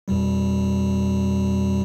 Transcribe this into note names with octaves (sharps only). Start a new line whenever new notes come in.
F2 B2 G3